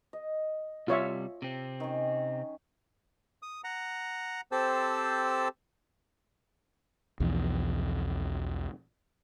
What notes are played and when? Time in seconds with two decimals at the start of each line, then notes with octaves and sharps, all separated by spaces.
0.13 D#5
0.88 C3 G3 F4 C#5 E5
1.42 C3 C4
1.80 D#3 C#4
3.43 D#6
3.64 F#5 A#5
4.52 C4 G4 A4 C5 A5 E6
7.20 B1 E2 F3